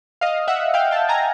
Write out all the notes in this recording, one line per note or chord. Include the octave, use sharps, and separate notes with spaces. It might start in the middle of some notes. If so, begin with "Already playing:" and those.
D#5 F5
E5 F#5
F5 G5
G5 A5
G#5 A#5